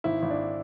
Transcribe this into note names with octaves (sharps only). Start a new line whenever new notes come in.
G#1 E4
G#1
D4